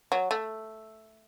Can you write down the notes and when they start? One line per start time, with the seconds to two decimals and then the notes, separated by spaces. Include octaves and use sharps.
0.12 F#3
0.31 A3